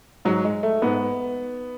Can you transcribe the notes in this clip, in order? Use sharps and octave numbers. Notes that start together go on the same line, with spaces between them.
G#2 F#3
G#3
A3
G#2 B3